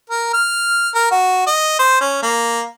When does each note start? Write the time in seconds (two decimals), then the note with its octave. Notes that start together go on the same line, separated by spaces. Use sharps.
0.10 A#4
0.34 F6
0.95 A#4
1.11 F#4
1.47 D#5
1.79 C5
2.01 C#4
2.23 A#3